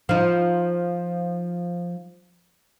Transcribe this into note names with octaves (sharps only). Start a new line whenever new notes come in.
F3 D#4